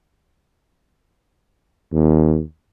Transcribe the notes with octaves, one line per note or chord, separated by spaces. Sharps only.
D#2